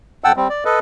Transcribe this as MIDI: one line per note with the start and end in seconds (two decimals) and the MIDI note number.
0.24 0.32 41
0.24 0.32 78
0.24 0.32 79
0.24 0.32 81
0.24 0.32 88
0.36 0.48 55
0.36 0.48 60
0.50 0.64 74
0.65 0.79 69
0.65 0.79 71
0.65 0.79 75